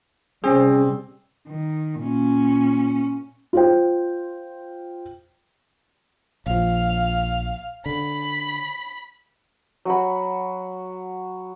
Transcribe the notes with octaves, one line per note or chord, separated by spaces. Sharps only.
C3 G3 C4 C#4 G#4
D#3
A#2 C#4
F4 C5 G5
A#1 F3 F5
D3 B5
F#3 F#4 B5